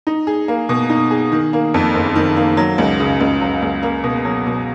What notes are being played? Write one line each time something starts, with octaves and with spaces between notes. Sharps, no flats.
D#4
G#4
A#3
B2
D#4
G#4
D#3
A#3
F2
F#1
D#3
A#3
F#3
C#2
C#3
C#2
F#3
C#2
A#3
B2
F#3
B2